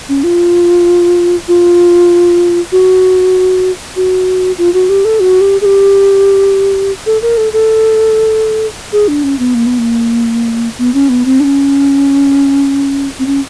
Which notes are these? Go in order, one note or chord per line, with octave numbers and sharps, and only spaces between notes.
C#4
F4
F4
F#4
F#4
F4
F#4
G4
A4
F#4
G4
G#4
G4
A4
A#4
A4
A4
G#4
D4
C#4
B3
A#3
B3
A#3
B3
C#4
B3
C4
D4
C#4
C4
C#4